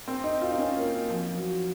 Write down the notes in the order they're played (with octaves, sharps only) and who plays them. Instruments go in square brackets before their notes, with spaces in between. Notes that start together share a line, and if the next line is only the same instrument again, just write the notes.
[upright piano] C4
D#4
F4
D#4
C#4
A#3
A#3
F3
F#3